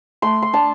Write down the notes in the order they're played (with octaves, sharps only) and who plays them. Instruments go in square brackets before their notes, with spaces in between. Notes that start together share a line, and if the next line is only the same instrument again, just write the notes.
[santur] A3 C6
C6
D4 A5